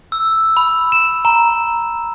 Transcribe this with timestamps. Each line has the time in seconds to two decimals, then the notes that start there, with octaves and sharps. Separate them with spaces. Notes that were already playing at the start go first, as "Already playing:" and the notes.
0.12 E6
0.57 B5
0.92 E7
1.25 A#5